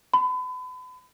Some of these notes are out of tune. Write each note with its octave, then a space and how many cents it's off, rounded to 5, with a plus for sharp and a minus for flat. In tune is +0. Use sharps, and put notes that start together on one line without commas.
B5 +35